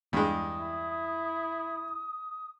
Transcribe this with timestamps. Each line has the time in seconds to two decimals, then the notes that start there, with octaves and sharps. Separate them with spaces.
0.13 E2 G2 G#3 D#6
0.57 E4